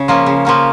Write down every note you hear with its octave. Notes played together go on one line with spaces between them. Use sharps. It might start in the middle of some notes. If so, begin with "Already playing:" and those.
Already playing: C#3
F3 A#3 C#4
C#3
F3 A#3 C#4